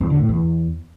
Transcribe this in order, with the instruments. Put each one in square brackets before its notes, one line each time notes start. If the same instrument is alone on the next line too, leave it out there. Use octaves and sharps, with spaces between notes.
[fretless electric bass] E2
D3
A2
E2